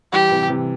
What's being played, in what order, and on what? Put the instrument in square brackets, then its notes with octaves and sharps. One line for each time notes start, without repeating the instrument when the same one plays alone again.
[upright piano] E3 G3 [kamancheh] G4
[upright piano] C3 E3
C3 E3